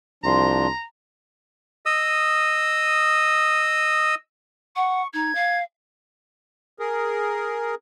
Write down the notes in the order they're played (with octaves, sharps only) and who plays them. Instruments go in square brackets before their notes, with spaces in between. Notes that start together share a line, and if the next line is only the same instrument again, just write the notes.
[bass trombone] C2 [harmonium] F3 D4 [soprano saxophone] A#5 [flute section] C6
[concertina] D#5 D#6 E6
[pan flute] F#5 [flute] C#6
[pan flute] D#4 [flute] G#6
[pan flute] F5
[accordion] G#4 A#4